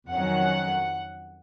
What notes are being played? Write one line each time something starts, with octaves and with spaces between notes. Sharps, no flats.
F2 D#3 F#3 C#4 F#5